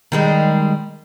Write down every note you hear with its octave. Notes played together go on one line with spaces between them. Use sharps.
D#3 G3 G#3